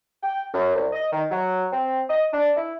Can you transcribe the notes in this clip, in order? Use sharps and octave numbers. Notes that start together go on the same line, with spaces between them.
G5
F#2
C2
D#5
D#3
F#3
C4
D#5
D4
E4